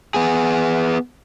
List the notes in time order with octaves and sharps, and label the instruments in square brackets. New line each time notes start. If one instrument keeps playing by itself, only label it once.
[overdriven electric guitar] B3 G#4